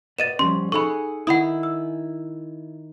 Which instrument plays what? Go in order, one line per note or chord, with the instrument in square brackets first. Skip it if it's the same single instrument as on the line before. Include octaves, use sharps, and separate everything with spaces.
[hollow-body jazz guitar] B4 D5 D#5 [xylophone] A6 D#7 E7
[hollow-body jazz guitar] F3 G3 C#4 [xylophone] C6
[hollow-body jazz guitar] D#4 A4 [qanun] G#4 F#5 [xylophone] B5 C#6
[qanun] D#3 E4 [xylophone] F#5 B5 D#6
[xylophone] E6